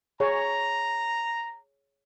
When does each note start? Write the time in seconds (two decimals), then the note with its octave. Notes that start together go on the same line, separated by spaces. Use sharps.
0.20 G#4 C#5 A#5